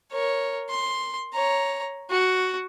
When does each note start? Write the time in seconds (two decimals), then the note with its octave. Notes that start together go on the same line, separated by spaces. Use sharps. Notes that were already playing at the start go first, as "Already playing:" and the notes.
0.12 A#4 C#5
0.70 C6
1.34 C#5 A#5
2.11 F#4